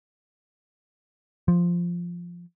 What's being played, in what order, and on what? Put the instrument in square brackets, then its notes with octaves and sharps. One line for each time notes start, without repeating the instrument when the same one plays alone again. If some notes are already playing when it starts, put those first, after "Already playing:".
[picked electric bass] F3